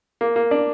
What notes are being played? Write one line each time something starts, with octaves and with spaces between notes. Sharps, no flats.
A#3
A#3
D4